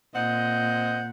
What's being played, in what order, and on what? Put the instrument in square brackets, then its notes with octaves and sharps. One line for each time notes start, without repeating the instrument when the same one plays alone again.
[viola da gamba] A#2 [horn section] C4 D#5 [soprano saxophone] F#5 [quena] G6